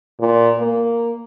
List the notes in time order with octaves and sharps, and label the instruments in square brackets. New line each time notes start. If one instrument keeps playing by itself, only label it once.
[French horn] A#2
A#3